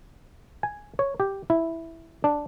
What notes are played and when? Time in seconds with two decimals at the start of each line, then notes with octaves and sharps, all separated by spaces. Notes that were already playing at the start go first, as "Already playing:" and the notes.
0.63 G#5
0.99 C#5
1.20 G4
1.50 E4
2.24 D4